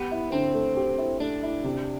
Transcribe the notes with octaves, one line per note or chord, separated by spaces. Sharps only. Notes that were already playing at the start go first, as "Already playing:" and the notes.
Already playing: B3 G4
E4
D3 C4
A3
G4
E4
A3 D4
E4
C3